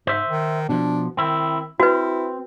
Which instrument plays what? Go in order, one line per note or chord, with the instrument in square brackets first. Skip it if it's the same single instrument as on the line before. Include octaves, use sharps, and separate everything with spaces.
[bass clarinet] G#2 [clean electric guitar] C5 E5
[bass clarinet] D#3
[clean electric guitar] B2 F3 [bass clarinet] D4
[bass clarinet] D#3 [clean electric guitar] C4 E4
[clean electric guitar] C4 [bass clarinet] E4 [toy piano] F#4 B4